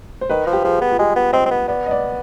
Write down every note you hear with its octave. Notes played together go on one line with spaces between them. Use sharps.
C5
D#3 B4
F3
G4
F3 G#4
B3
F4
G#3 G4
B3
C4 D#5
C4
B3
B3 D5
D#5
D5